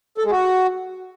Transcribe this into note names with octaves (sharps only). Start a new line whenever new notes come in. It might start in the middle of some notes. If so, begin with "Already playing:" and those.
A4
G#3
F#4